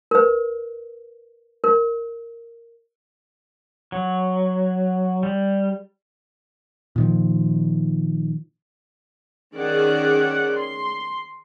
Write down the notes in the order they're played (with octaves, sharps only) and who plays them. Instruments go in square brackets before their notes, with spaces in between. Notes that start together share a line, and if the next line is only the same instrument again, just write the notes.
[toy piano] A#4 B4
A#4
[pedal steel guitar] F#3
G3
[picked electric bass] A#2 D#3 F3
[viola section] D#3 C#4 G#4 D5 F#5
C6